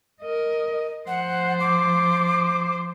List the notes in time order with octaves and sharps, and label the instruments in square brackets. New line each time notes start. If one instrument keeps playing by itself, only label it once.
[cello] A#4 D#5
[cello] F3 C5 [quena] F#5
[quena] D6